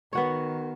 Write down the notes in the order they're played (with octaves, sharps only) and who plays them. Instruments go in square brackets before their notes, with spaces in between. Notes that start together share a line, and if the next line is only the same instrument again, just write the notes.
[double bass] D#3 [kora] B3 F#4 C#5